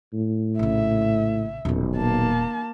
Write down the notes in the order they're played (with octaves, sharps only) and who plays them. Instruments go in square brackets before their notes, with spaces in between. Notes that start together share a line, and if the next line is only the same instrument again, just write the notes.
[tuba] A2
[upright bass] A#1 C#3 [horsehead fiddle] E5
[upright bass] D#1 A#2 [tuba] B1
[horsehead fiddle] A#3 A5